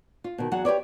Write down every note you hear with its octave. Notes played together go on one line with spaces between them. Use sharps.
F4
B2 D#3
E2 F#3 G#4 F#5
G4 B4 C#5 D5